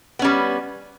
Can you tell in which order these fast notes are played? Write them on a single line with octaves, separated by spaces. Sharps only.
B3 C#4 G3